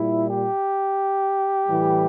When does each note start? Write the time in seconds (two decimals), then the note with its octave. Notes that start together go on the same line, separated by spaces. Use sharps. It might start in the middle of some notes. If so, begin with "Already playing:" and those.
Already playing: A#2 G3 E4
0.29 G4
1.68 A2 E3 G3